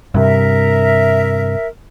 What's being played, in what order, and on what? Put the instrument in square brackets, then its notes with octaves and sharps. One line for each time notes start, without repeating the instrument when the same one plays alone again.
[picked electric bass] G2 C3 [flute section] A#4 E5